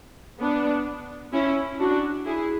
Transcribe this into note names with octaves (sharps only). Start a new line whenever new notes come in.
B3 D4
C#4 E4
D4 F#4
E4 G#4